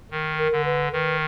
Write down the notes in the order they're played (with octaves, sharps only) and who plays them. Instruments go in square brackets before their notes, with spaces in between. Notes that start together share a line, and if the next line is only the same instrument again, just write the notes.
[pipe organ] D#3 [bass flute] A#4
[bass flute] A#4
[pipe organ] D3
[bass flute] B4
[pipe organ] D#3 [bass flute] B4